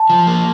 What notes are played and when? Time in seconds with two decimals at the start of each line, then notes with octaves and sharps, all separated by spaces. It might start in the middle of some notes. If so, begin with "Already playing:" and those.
Already playing: A5
0.10 F3
0.27 A#3